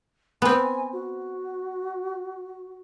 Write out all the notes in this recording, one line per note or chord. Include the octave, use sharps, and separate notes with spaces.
B3 C4 G#5
F#4